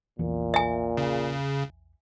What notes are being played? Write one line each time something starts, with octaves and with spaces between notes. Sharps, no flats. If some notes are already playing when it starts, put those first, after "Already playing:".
A#1 E2 A#2 E3
E5 G#5
C#3